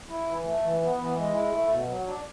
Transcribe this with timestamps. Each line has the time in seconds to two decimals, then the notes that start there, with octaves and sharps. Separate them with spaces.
0.09 E4
0.27 E3
0.45 A3
0.63 E3
0.81 B3
0.99 E3
1.17 G#3
1.34 E4
1.52 A3
1.70 B2
1.88 F#3
2.06 D4